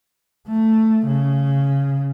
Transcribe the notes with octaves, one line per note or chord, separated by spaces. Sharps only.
A3
C#3